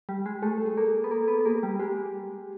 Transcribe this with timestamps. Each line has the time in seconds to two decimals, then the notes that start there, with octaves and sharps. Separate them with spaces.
0.09 G3
0.26 G#3
0.42 A3 G#4
0.58 A4
0.65 G#4
0.77 A#3 A4
0.89 G#4
1.04 B3
1.11 A#3 A4
1.28 B3
1.41 B3
1.46 A#3 G#4
1.63 G3
1.79 G#3 G4